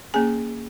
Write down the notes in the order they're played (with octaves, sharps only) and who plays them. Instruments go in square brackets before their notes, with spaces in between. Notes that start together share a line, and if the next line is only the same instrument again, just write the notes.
[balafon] A#3 C#4 G#4 G#5